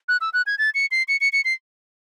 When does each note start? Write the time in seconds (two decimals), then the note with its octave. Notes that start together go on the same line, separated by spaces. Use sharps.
0.08 F#6
0.21 E6
0.33 F#6
0.46 G#6
0.58 A6
0.74 C#7
0.91 C7
1.08 C#7
1.21 C#7
1.32 C#7
1.45 C7